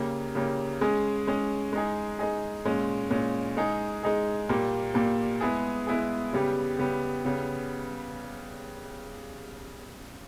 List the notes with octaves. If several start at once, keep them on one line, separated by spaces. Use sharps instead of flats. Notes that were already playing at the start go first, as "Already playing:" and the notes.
Already playing: C#3 G3 A#3
C#3 G3 A#3
G#3 C#4 G#4
G#3 C#4 G#4
G#3 D#4 G#4
G#3 D#4 G#4
A#2 G#3 C#4
A#2 G#3 C#4
G#3 D#4 G#4
G#3 D#4 G#4
A#2 G3 A#3
A#2 G3 A#3
G#3 B3 E4 G#4
G#3 B3 E4 G#4
C#3 G3 B3 G4
C#3 G3 B3 G4
C#3 G3 B3